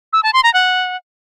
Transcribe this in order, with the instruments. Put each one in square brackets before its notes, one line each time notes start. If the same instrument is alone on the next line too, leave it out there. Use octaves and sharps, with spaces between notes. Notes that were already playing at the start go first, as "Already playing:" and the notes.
[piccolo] E6
A5
C6
A#5
F#5